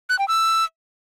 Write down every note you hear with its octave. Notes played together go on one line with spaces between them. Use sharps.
F#6
G5
E6